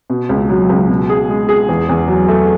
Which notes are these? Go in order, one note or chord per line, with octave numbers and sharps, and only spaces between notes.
B2
C#2
F#3
C#2
B2
G#4
G#3
G#4
E2
E2
F#3
A3